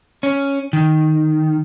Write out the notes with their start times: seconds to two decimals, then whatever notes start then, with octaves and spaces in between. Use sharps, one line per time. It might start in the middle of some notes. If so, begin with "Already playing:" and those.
0.23 C#4
0.73 D#3